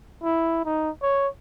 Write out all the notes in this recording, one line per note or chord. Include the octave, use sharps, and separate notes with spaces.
E4
D#4
C#5